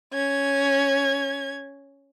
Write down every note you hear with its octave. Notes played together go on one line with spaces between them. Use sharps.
C#4 G#6